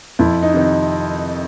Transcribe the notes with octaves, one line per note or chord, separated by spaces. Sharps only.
F2 E4
D#4
C3 D#3